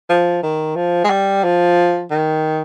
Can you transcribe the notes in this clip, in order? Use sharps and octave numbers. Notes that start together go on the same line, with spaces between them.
F3
D#3
F3
G#3
G3
F3
D#3